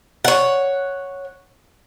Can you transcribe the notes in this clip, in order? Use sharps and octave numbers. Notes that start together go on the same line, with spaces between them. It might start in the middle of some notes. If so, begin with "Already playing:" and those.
C#5 F#5